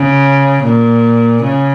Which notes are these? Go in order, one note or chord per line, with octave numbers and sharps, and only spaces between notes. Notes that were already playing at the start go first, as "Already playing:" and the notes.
Already playing: C#3
A#2
C#3